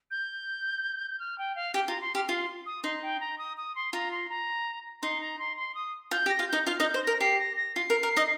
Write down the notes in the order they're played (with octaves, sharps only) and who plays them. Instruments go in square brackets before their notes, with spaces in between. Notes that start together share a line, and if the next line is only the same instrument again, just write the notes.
[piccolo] G6
F6
G5
F5
[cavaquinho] G4 [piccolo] G5
[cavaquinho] F4 [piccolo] A#5
[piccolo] C6
[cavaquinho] G4 [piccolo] F6
[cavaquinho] F4 [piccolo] C6
[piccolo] D#6
[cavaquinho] D#4 [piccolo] C6
[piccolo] G5
A#5
D#6
D#6
C6
[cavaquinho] F4 [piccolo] A#5
[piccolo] C6
A#5
[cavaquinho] D#4 [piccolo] C6
[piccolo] A#5
C6
C6
D#6
[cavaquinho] F4 [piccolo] G6
[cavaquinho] G4
[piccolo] A#6
[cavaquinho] F4 F5
[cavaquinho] D#4 D#5 [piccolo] G6
[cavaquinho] F4 F5 [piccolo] F6
[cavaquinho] D#4 D#5
[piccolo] G6
[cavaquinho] C5
[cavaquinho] A#4 [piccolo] A#6
[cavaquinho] G4 [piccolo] C7
[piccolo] A#6
A#6
[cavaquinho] F4 [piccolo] C7
[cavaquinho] A#4
A#4
D#4 D#5